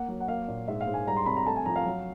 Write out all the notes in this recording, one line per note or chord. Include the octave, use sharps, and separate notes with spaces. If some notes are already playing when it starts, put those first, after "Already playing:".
Already playing: A#3 F#5
F#3
F#5
A#3 F5
A#2
G#2 E5
F5
G#2
G#5
G3 A#5
C6
C3 B5
A#5
A3 A5
G#5
F3 A#5
F5
F#3